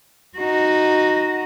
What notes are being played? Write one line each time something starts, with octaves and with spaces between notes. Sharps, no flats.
D#4 F#4